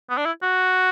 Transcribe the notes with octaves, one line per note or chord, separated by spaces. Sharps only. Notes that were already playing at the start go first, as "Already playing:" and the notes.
B3
D4
E4
F#4